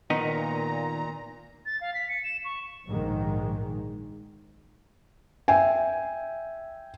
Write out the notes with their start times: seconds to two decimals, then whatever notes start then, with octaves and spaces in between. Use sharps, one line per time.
0.10 A#2 D#3 B3 D#4 A#5
1.66 A6
1.81 F5
1.94 B6
2.09 C#7
2.24 E7
2.45 C#6
2.87 A#1 G#2 D#3 G#3
5.48 E5 G5 G#5